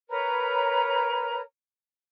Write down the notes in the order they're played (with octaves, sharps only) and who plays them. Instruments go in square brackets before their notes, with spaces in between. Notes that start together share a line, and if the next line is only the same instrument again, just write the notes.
[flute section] A#4 B4 C#5 A#5